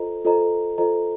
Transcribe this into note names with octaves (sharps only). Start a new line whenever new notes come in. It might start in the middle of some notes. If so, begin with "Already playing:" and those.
Already playing: F4 A4 C5 D#5 A#5
F4 A4 C5 D#5 A#5
F4 A4 C5 D#5 A#5